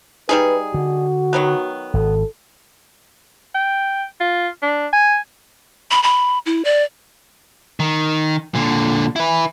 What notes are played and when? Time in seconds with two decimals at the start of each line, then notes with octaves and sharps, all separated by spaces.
0.29 G3 D#4 G#4 B4
0.74 D3 F#4
1.33 D#3 F#3 B3
1.94 G#1 A4
3.55 G5
4.21 F4
4.62 D4
4.93 G#5
5.91 B5
6.03 B5
6.46 E4
6.65 D5
7.80 D#3
8.55 A#2 D3
9.16 E4 B4